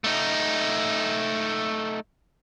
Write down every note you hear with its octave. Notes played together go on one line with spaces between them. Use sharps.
A3 D#4